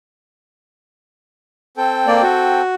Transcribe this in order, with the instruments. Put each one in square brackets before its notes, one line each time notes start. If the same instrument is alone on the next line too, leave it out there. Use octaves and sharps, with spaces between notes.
[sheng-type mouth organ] C4 A4 G5
[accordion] A#3 D5
F#4